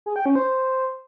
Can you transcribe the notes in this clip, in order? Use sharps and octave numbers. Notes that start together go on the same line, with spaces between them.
G#4
G5
C#4
C5